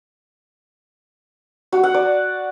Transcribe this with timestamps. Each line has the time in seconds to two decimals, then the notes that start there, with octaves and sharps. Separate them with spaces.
1.72 F#4
1.83 F#5
1.94 D5